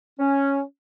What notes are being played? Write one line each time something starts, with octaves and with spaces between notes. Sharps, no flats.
C#4